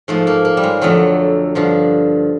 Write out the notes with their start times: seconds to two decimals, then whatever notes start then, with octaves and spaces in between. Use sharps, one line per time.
0.08 G#2 F3 A3
0.27 A#3
0.45 A#3
0.57 G3
0.63 G#3
0.81 F2 D3 F#3 A3
1.55 G2 D3 F3